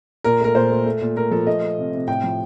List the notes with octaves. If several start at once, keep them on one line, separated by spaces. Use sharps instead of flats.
A#2 A#4
A3 A#4
A#2 C5
A3
A3
A#2
A3 A#4
F3 A4
A3 D#5
A3
C3
C3
A2 G5
F3